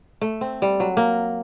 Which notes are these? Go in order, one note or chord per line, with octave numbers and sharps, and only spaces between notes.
A3
C4
G3
F#3
A#3